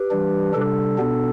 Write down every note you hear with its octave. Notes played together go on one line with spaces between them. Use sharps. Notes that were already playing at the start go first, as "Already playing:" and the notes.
Already playing: G4 B4
E3 G3 D4
C3 G3 D4 A4
B2 B3 D4